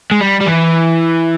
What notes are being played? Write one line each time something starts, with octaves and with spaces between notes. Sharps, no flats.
G#3
G3
G3
E3